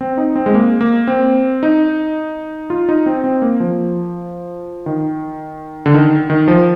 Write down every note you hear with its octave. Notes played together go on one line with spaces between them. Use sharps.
C4
D#4
C4
G#3
A#3
A#3
C4
D#4
F4
D#4
C4
C4
A#3
F3
D#3
D3
D#3
D#3
F3